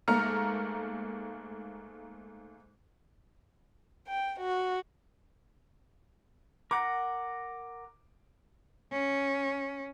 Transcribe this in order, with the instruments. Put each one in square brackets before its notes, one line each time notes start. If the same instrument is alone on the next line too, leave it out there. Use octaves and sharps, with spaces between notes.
[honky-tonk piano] G#2 A3 A#3 A#5 F6 C#7
[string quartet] G5
F#4
[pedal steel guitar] A#4 F#5 A#5 [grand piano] D6
[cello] C#4